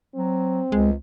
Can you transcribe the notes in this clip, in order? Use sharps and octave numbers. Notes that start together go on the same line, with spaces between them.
F#3 C4
C#2 G#3